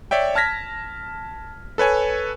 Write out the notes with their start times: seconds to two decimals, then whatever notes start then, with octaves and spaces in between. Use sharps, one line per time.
0.11 C#5 D5 E5 G5
0.35 A5 F6 G#6 A#6 B6
1.78 A4 B4 C#5 G#5